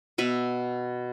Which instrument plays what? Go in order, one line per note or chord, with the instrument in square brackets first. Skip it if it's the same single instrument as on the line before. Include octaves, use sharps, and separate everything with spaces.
[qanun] B2 B4 E5